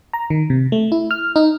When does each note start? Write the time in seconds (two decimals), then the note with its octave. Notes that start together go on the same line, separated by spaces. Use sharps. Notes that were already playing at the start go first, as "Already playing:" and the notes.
0.13 A#5
0.30 D#3
0.50 C3
0.72 A3
0.92 E4
1.11 F6
1.36 D#4